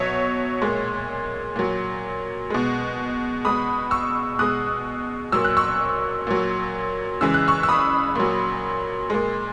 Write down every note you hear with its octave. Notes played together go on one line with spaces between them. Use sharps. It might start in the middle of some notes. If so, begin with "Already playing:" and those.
Already playing: B2 F#3 C#5 E5
A#2 G#3
A#2 F#3
B2 G#3
B2 G#3 B5 D#6
C#6 E6
B2 G#3 D#6 F#6
A#2 F#3 E6
F#6
C#6 E6
A#2 F#3
C#3 E3 G#3 E6
F#6
C#6 E6
E6
B5 D#6
A#2 F#3
A#2 G#3